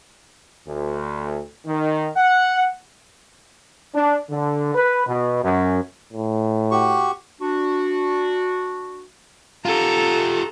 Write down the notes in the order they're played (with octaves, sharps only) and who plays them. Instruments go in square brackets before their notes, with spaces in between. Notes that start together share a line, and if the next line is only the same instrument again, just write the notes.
[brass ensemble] D2
D#3
F#5
[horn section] D4
D3
B4
B2
F#2
[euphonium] A2
[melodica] F#4 G4 C#6
[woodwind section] D4 F#4
[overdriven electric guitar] F4 G4 [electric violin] A4 A#5